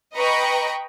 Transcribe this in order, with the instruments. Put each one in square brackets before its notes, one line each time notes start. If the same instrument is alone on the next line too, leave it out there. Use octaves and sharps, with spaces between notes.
[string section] B4 D#5 G5 A#5 B5 C#6